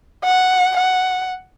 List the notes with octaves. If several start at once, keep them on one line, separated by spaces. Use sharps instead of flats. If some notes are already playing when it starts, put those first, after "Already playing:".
F#5
F#5